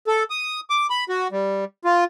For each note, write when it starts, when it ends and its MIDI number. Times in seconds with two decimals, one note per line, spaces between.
0.07 0.23 69
0.30 0.60 87
0.70 0.87 86
0.90 1.04 83
1.09 1.28 66
1.32 1.65 55
1.85 2.04 65